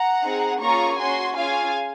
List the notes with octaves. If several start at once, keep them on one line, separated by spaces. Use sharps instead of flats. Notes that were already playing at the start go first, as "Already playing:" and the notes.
Already playing: F#5 A#5
C4 D#4 G#4
A#3 C#4 F4 G#4 A#5 C#6
C#4 F#4 G#5 C6
C#4 F4 G#4 F5 G#5